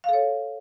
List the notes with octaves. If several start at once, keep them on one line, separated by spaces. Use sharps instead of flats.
A4 C#5 F5